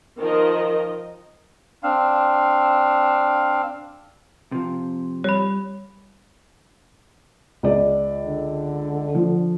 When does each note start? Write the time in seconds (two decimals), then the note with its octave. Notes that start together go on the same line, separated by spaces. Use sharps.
0.19 D#3 F3 A#4 D#5
1.83 C4 D4 F5
4.52 C3 F3
5.24 G3 C#5 B5
7.63 C#2 D5
8.27 D3
9.15 F3